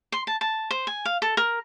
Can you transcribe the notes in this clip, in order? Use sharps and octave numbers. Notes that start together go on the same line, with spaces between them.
C6
A5
A5
C5
G#5
F5
A4
A#4